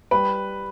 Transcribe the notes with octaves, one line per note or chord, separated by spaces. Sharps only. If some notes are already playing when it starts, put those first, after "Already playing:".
G3 B4